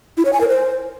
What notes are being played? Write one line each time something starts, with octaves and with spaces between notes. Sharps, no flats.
E4
C#5
G#5
A#4
C5